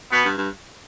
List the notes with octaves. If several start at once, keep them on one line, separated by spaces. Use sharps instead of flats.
B2 B3
G2
G2